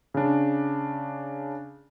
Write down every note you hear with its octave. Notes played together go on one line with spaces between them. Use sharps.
C#3 D4